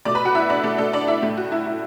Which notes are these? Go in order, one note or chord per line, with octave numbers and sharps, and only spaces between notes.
B2 A3 D5 D6
B4 B5
F#4 F#5
E4 E5
D4 D5
A3 A4
A3 A4
D4 D5
E4 E5
A2 A3
F#4
E4
E4